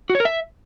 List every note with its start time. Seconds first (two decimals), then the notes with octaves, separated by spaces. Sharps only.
0.10 F#4
0.15 C#5
0.20 A#4
0.25 E5